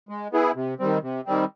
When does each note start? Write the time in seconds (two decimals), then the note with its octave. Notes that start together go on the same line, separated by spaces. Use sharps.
0.09 G#3
0.32 B3 E4 G#4
0.56 C3
0.79 D#3 G3 C4
1.03 C3
1.26 D#3 G3 C4